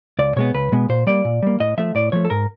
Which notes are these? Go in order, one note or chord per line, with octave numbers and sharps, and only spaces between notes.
C#2 D5
B2 G#3 B3 C#5
C#2 B4
B2 G#3 B3
A#2 C5
G3 A#3 D5
A#2
G3 A#3
A2 D#5
F3 A3 E5
A2 D5
F3 A3 C#5
A4
G#2 A#4